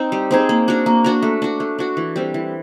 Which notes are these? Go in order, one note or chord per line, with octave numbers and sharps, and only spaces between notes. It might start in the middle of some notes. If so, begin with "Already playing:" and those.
Already playing: C4 D#4
G3
C4 D#4 G#4
A#3
D4 F#4 A#4
A#3
D4 F#4 A#4
A3
D4 F#4
A3
D4 F#4
E3
G3 C4
E3